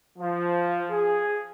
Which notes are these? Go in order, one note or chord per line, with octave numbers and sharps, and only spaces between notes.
F3
G#4